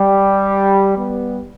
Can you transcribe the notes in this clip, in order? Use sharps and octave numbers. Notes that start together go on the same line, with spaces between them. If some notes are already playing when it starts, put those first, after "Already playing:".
Already playing: G3
G3 B3